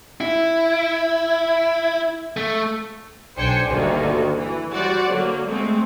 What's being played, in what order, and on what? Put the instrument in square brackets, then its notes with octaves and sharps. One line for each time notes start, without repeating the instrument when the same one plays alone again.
[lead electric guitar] E4
A3
[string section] B1 D4 C5 G5 G#5 C#7
G1 D2 D3 D#3 A#3 F#4
E3
G3 F#4 C5 D5 F#5
D3 F#3 A#3
G#3 A3 C4